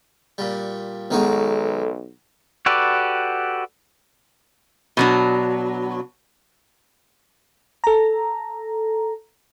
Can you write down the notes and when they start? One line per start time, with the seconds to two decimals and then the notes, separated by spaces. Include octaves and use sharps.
0.38 A#2 G3
1.11 B1 D#3 G#3 B3 D#4 F#4 A4
2.66 F#4 G4 A4 B4 D5
4.97 B2 F#3 D4
7.84 A4 A#5